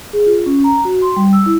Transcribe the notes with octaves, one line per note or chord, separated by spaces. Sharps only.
G#4
F4
C#4
A#5
F#4
C6
G3
E6
E4